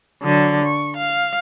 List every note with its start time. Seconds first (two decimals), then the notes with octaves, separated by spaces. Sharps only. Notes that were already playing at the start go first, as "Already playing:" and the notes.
0.23 D3 F#3
0.64 C#6
0.97 F5